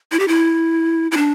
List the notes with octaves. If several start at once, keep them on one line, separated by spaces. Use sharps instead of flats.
E4
G4
E4
E4
D4